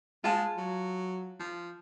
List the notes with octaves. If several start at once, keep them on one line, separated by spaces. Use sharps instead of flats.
G#3 F4 A5
F#3
F3